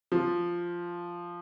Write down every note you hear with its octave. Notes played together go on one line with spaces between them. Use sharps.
F3